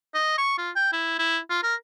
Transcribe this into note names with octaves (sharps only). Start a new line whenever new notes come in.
D#5
C#6
F4
G5
E4
E4
F4
A#4